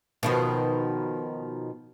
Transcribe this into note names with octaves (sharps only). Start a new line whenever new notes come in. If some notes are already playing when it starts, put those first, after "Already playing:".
B2 D#3 F3